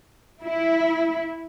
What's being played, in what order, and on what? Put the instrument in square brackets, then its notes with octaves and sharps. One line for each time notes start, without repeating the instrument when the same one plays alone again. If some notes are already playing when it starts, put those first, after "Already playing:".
[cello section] E4